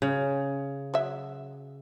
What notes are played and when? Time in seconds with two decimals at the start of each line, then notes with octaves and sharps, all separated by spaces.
0.02 C#3
0.94 F#3 E5